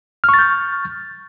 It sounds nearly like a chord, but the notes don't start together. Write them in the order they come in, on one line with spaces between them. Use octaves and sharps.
F6 C#6 A6 G6